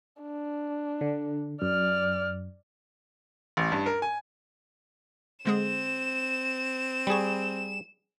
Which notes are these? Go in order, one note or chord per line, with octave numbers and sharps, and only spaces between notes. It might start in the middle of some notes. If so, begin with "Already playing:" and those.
D4
D3
F#2 D5 F6
A1
G2
A#4
G#5
D3 G#3 C4 G#4 E7
G3 G#4 B5 C#6